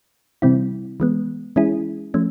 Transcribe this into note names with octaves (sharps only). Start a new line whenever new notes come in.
C3 E3 G3 C4 E4
E3 G#3 B3
E3 G#3 C#4 E4 G#4
F3 A3 C#4